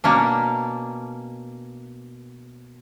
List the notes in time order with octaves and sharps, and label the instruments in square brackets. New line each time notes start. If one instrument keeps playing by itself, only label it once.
[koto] B2 A#3 C#4 D4